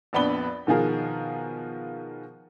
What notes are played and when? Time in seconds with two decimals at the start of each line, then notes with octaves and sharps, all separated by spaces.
0.13 A#1 F2 B3 D4 B5 G7
0.67 B2 D#3 F3 G#4 A#4